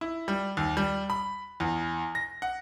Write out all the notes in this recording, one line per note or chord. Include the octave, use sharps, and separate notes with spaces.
E4
G3
D#2
G3
B5
E2
A#6
F#5